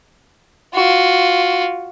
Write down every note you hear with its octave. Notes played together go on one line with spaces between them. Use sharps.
F4 F#4